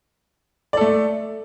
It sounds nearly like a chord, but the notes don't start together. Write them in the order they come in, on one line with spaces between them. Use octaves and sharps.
D5 A4 A3